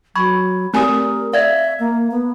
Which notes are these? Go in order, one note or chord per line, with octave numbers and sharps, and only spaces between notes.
F#3 B5 C#6 G#6
A3 C4 G4 A#4 G#5 D#6
D5 E5 F5 G#6
A#3
B3